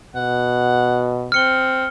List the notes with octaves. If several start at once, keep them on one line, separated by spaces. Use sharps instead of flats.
B2 F#5
C4 F6 C#7 G7